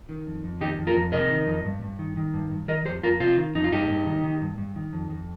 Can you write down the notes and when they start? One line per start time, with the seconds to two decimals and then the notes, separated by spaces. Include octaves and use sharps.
0.09 D#3
0.27 F2
0.44 F2
0.61 D#3 D#4 G4
0.78 F2
0.87 F4 A#4
0.96 F2
1.12 C3 A#4 D#5
1.30 D#3
1.47 F2
1.65 G2
1.82 G2
1.99 D#3
2.17 D#3
2.34 G2
2.52 G2
2.68 D#3 A#4 D#5
2.85 F2 G4 C5
3.03 F2 F4 A#4
3.20 C3 C4 F4
3.37 D#3
3.55 F2 D#4
3.64 F4
3.72 G2 D#4 G4
3.90 G2
4.06 D#3
4.24 D#3
4.41 G2
4.58 G2
4.76 D#3
4.93 F2
5.10 F2